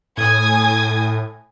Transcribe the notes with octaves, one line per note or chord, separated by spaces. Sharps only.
A2 G#5 D#6 G#6